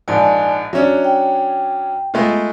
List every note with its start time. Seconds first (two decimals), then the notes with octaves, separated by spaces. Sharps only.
0.08 A#1 G#2 D5 G#5 A5
0.73 F#3 C#4 D4 E5
1.05 G5
2.14 G#3 A3 B3 F4